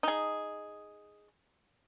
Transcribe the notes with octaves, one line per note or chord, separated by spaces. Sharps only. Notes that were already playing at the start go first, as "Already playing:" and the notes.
D#4 G#4